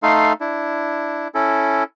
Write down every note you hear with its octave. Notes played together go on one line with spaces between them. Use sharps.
A3 D#4 A4 F5 C6
D4 E4
C#4 E4 A4